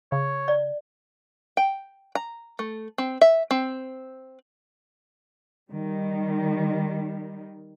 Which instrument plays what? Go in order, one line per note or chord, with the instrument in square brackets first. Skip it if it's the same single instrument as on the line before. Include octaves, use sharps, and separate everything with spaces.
[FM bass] C#3 [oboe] C#5
[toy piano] D5
[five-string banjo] G5
A#5
A3
C4
E5
C4
[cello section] D#3 G3